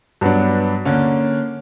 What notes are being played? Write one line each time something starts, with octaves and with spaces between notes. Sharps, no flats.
G2 F#3 B3 D4
D3 A#3 C#4